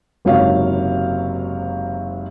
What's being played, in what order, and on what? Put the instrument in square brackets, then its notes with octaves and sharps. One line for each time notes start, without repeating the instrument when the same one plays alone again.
[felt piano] F#1 G#2 C3 F#3 C#5 F5